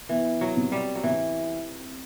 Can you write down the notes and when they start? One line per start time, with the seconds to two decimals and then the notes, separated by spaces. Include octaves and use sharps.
0.09 E3 B3
0.41 F#3
0.56 C3
0.72 G3
0.95 F#3
1.03 C3 E3